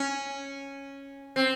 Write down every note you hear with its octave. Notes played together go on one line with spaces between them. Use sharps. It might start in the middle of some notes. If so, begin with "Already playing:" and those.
Already playing: C#4
C4